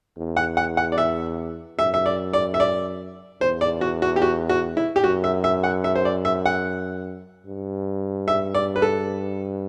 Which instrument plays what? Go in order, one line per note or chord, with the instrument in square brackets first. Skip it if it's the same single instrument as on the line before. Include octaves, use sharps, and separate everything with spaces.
[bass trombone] E2
[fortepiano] F#5
F#5
F#5
D5
E5
[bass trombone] F#2 [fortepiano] E5
[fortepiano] E5
D5
D5
E5
D5
[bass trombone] E2 [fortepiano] C5
[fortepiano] D5
F#4
F#4
G4
F#4
F#4
E4
G4
[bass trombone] F#2 [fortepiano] F#4
[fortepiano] E5
E5
F#5
E5
C5
D5
E5
F#5
[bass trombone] G2
[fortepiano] E5
D5
B4
A4